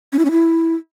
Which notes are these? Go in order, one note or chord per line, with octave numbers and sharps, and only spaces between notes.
C#4
E4
C#4
E4